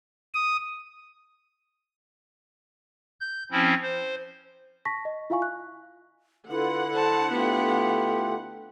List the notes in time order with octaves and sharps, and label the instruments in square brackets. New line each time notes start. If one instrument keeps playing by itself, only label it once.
[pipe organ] D#6
G6
F3 C4 C#4 E4
C5
[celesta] A5 C#6 A#6 B6
D#5
E4 F4 E5 F5 G#5 C#6
F#6
[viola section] D3 F#5 [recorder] E4 [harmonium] F4 B4
[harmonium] C5 [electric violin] A5
[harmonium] A3 F4 G4 [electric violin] B3